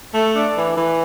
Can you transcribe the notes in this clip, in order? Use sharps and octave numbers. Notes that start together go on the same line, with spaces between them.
A3
D4
E3
E3